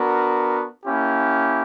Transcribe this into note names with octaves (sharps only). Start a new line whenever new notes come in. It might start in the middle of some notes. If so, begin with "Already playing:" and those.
Already playing: B3 D4 F#4 A#4
A#3 C#4 E4 G4